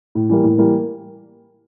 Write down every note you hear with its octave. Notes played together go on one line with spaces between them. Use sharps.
A2
E3 G3 A#3
A2
E3 G3 A#3